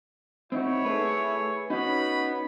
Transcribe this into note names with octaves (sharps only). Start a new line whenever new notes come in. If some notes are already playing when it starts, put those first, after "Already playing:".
C4 D#4 E4 F#4 C#5
A3 G#4 B4
B3 C#4 D#4 F#4 B5